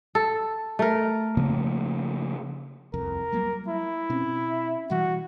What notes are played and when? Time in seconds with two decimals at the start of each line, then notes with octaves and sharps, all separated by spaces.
0.15 A4
0.79 A3 A#4
1.37 C#3 F3 A#3
2.94 D#1 C2 F2 A#4
3.32 F#3 G3 A#3
3.68 E4
4.10 B2 C4 C#4
4.90 B2 E3 G3 F#4